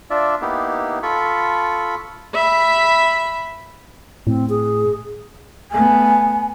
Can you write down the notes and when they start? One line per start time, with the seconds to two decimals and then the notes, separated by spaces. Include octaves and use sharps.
0.10 D4 F4 D5 E5
0.42 A#3 B3 D#4 E4 G4
1.03 F4 A4 B5 C#6
2.35 E5 B5
4.27 A2 C4
4.49 G#4
5.71 A3 B3 G#5